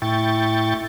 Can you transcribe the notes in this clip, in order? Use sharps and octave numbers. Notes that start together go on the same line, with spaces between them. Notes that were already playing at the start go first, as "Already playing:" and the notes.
A2 E4 G5 C#6 A6